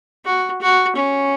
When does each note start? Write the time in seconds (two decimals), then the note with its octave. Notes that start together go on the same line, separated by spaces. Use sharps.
0.25 F#4
0.61 F#4
0.96 C#4